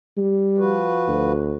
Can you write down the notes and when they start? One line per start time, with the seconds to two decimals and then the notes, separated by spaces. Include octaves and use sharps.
0.17 G3
0.58 F3 F#4 B4
1.08 D2